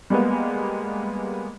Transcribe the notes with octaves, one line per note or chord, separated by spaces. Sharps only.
G3 G#3 A#3 B3